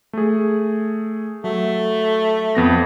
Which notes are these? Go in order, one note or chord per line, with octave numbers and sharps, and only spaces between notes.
A3 G#4
F#3 A3
F2 B3 A#6